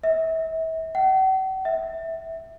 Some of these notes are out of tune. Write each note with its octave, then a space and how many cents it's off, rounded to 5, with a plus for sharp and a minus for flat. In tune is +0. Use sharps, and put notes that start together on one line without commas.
E5 -35
F#5 +45
E5 -10